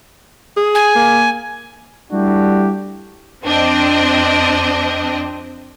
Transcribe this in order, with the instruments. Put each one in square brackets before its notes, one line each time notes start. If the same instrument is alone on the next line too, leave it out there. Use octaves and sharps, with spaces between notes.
[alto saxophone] G#4
[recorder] G#5
[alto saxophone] A#3
[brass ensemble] G3 A3 D4 E4 F#4 G4
[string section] F2 C4 D4 D#5